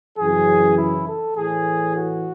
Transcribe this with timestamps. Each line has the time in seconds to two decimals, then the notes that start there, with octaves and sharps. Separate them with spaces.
0.17 F#2 C#3 E3 G#4
0.77 E4
1.06 A4
1.35 A2 E3 G#4
1.95 F#4